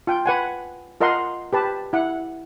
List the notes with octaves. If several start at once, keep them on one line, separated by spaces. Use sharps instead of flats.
F4 G5
B4 F#5 G#5
F4 A#4 D#5 F#5 C6
G4 B4 A5
E4 F#5